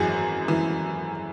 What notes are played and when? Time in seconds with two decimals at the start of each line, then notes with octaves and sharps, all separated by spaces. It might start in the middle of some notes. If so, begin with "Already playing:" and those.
Already playing: G#1 F#2 E3 F#4 G#4
0.48 E3